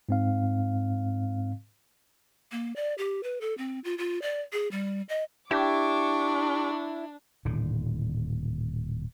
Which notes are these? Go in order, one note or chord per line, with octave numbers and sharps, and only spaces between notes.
G#2 C4 F5
A#3
D5
G4
B4
A4
C4
F4
F4
D5
G#4
G3
D#5
D4 E4 G4 C#6 D6
D#1 A2 D3